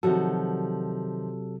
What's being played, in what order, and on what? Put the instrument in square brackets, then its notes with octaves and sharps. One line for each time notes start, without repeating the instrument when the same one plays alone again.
[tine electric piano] C3 F#3 A4 [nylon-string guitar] D#3 F3 F#4